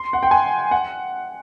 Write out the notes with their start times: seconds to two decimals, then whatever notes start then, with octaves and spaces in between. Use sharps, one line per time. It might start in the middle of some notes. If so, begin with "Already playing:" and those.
Already playing: C6
0.13 F#5
0.23 G5
0.31 G#5
0.71 F#5